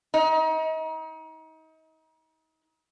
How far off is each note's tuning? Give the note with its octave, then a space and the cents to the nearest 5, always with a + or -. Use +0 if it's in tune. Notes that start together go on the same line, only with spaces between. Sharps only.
D#4 +35